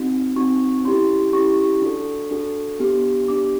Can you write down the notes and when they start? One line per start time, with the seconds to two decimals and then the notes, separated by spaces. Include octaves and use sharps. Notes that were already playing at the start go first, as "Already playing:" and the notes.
Already playing: C4 D#4 F#4
0.36 C4 D#4 F#4 C#6
0.84 C#4 E4 G4 C6
1.33 C#4 E4 G4 C#6
1.82 D4 F#4 A4
2.31 D4 F#4 A4
2.79 B3 D4 G4
3.28 B3 D4 G4 D6